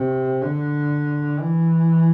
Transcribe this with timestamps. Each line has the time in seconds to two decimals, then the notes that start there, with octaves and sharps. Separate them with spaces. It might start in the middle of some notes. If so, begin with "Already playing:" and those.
Already playing: C3
0.41 D3
1.39 E3